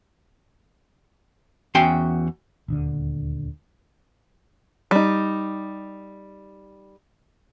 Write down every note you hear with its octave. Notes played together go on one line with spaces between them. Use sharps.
E2 C#4 F#4 G5 G#5 C6
D#1 D2 D3
G3 D#4